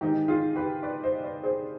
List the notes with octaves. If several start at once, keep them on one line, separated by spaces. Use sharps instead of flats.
G#2 D#3 D#4 G4
F4 G#4
G4 B4
B4 D5
C5 D#5
B4 D5
G#4 C5